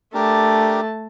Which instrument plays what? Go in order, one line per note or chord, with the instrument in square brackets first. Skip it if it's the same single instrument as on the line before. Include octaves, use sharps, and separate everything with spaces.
[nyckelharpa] A3 A5 [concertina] D4 G4 A#4